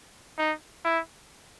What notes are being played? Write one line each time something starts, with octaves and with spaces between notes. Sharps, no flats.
D#4
E4